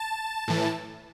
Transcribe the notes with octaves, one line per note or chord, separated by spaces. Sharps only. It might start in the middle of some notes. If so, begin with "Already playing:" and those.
Already playing: A5
A2 E3